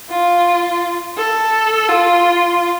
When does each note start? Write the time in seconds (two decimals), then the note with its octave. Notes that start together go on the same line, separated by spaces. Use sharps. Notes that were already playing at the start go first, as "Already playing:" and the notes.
0.10 F4
1.17 A4
1.89 F4